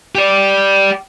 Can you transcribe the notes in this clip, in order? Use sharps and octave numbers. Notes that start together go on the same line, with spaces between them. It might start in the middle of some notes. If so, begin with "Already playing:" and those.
G4 D5